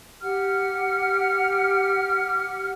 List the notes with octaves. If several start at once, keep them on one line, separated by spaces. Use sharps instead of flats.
G4 F#5 F6